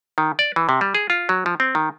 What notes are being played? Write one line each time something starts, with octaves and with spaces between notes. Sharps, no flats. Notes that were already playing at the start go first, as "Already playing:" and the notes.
D#3
D5
E3
C3
G3
G#4
F4
F#3
F3
C4
D#3